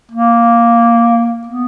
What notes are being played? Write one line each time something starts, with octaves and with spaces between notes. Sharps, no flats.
A#3
B3